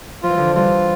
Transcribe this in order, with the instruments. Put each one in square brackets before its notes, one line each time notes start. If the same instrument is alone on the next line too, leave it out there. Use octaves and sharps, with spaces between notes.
[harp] F3 [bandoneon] F4
[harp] E3
D3 F3
[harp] E3 G3 [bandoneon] F4